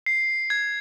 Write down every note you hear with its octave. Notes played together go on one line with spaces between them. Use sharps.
C7
G#6